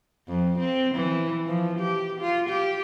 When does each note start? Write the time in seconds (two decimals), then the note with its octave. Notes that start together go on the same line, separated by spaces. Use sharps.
0.28 F2
0.59 C4
0.95 E3
1.47 F3
1.79 G4
2.21 F4
2.49 G4